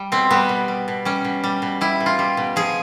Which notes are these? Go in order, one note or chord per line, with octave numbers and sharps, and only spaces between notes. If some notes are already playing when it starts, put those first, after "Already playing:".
Already playing: G3
B2 C4
G3 B3
B2
G3
B2
G3 C#4
B2
G3
B2
G3 E4
B2
F4
G3
B2
F3 G#4